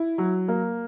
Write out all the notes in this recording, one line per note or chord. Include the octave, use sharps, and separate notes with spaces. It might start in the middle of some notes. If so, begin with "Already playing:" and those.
Already playing: E4
F#3
A#3